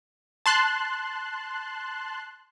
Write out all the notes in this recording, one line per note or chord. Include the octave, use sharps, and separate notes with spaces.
A5 C6 F#6